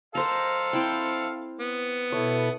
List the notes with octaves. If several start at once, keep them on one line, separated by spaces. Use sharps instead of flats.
A4 A#4 C5 F5 A#5
C4 E4 G5
B3
B2 E4 A4 C#5